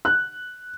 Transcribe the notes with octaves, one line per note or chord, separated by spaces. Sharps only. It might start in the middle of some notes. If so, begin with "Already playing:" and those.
F#6